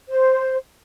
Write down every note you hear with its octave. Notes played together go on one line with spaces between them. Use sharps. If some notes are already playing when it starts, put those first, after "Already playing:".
C5